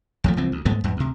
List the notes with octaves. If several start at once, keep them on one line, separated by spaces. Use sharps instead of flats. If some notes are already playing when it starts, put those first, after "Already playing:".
D#2 F3 A3
C2 E3 F3 C4
D2
G#2 G#3 A3 B3
E2 G#2 F#3
D2 C3